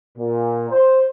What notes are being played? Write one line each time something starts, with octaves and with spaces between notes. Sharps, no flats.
A#2
C5